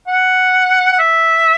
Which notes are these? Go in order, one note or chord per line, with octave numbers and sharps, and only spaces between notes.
F#5
F#5
E5